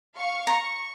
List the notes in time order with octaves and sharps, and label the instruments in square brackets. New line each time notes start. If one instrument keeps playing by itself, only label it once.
[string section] F5 C#6
[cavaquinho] A#5 [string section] C#6